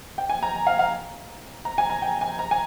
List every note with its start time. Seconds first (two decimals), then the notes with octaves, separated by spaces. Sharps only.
0.18 G5
0.29 G#5
0.43 A#5
0.67 F5
0.79 F5
1.65 A#5
1.78 G#5
1.90 A#5
2.02 G5
2.21 G#5
2.39 A#5
2.51 G#5